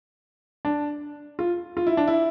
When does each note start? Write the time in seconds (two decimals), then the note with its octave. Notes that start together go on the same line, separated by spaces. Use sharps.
0.65 D4
1.39 F4
1.77 F4
1.87 E4
1.97 D4
2.08 E4